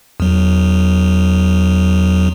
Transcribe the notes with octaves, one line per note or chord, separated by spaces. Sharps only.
E2 F#3